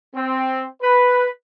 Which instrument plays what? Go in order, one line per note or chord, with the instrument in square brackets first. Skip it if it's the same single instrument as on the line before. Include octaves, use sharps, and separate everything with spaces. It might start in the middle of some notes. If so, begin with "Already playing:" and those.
[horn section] C4
B4